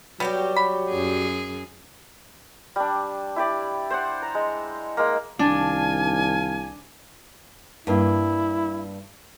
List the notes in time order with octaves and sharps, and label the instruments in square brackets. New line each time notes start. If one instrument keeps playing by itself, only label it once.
[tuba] F#3 [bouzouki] G3 F#4 G4 [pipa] B3
[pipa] B5
[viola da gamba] F#2 G#4
[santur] G3 D4
E4 G4 D5
C5 D5 F#5
A#5
G#3
G#3 A#3
[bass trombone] C2 [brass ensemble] D#3 F5 A5 [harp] D4 [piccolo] G#5
[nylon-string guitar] G2 A#3 [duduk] E4